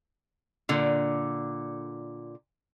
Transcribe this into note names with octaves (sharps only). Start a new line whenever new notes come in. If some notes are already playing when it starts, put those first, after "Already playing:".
A#2 D3